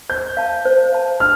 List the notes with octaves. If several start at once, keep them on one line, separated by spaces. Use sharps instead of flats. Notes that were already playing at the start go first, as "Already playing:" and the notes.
C5 G6
F5 A5
C5
F5 A5
D4 F6